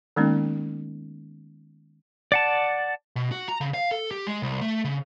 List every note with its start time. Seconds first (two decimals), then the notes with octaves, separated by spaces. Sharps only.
0.16 D#3 G#3 A#3 B3 C#4 D#4
2.32 D5 F#5 A5
3.16 B2
3.32 F#4
3.48 A#5
3.61 C#3
3.74 F5
3.91 A4
4.11 G4
4.27 G#3
4.42 C2
4.61 A3
4.85 C#3